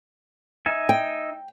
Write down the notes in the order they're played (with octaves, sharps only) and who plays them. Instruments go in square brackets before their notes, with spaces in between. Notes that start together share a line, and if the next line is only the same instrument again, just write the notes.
[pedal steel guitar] D#4 E5 G#5
[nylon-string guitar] G5